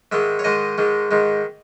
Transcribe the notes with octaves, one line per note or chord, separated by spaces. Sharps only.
G#2 D#3 G#3 E5
C#5
G#2 D#3 G#3 D#5
G#2 D#3 G#3
G#2 D#3 G#3